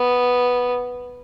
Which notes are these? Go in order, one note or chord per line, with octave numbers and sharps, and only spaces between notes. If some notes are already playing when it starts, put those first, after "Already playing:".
Already playing: B3